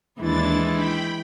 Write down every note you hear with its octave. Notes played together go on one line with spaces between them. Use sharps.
D#2 E3 G#3 D4 E4 A6
G5 B5